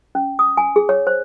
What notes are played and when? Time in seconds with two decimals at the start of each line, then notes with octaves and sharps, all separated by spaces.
0.15 C#4
0.39 D#6
0.57 G#5
0.76 G#4
0.89 C#5
1.07 C5